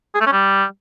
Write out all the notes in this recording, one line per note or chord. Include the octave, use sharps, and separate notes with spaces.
G#4
A3
C#4
G3